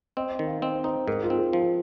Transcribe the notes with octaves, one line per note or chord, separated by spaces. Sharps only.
C4 D#5
D#5
D#3
F5
C4 D#5
D#4 C5
G#2 A#4
F4
C4
G#4
F3